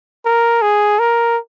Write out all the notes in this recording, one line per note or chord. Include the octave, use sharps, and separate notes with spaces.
A#4
G#4
A#4